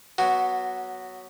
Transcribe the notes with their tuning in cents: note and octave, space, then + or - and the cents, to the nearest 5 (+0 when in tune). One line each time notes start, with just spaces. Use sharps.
F#3 +0 B3 -20 F#4 +0